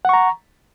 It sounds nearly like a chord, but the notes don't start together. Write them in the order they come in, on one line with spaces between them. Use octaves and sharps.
F#5 C#6 A#5